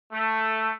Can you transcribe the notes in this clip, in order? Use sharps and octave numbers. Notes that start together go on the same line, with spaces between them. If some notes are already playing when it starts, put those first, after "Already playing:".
A3